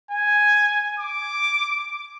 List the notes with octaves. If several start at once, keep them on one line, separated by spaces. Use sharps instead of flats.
G#5
D6